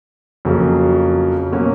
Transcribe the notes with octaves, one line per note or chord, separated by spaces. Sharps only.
F2 C#3 F#3 A#3
B2 F#3 A#3 C#4